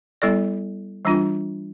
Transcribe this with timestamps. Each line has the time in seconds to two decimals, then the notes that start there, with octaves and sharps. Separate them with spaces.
0.22 G3 B3 E4 A4 D5
1.05 E3 G3 D4 F4